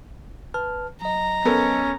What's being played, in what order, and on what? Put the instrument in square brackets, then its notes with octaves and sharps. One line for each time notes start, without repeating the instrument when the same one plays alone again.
[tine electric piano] B4 A5 F6
[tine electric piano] F#3 D#5 [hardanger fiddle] A#5
[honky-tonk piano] B3 A4 A#4 [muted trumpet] C#4